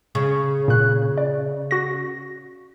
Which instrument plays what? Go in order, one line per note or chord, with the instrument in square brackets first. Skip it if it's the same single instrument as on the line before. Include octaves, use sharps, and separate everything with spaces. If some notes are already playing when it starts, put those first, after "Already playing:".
[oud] C#3
[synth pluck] A#2 F#6
D5
F#4 A#6